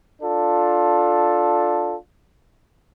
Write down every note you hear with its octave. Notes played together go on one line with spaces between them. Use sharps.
D4 F4 A4